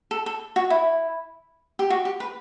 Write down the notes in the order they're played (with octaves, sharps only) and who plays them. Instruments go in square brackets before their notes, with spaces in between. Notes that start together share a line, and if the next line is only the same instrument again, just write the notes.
[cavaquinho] A4
A4
F#4
E4
G4
F#4
G4
B4